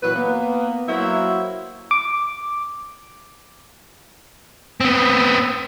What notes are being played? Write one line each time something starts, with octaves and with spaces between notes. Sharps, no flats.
A#2 E3 F#3 B4
A#3 B3
F#3 A#3 E4 F#4 C5 E5
D6
B3 C4